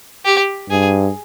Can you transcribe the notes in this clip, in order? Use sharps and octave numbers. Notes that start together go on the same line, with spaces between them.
G4
G2 G#4